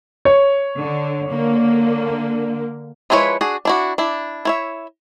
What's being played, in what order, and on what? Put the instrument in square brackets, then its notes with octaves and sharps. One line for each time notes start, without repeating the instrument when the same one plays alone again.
[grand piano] C#5
[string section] D3
D3 A#3
[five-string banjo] F3 G#3 E4 B4 C#5
D4 F#4 G#4
D4 E4 F#4
D4 E4
E4 C#5 E5